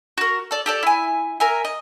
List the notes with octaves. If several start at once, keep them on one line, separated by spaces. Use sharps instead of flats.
F#4 A#4
A4 D5
G4 A4 D5
E4 G#5
A#4 E5 G#5
D#5